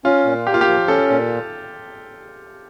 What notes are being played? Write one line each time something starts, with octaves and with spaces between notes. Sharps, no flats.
C#4 F4
A#2
A#3 G4
F4
G4
F3
C#4 A4
A#2